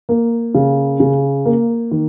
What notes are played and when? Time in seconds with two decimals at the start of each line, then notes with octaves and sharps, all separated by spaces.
0.09 A#3
0.55 C#3
1.00 C#3
1.45 A#3
1.91 D#3